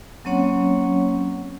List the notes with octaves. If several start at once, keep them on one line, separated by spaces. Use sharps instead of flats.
F#3 A#3 C4 C#4 C#5 F#5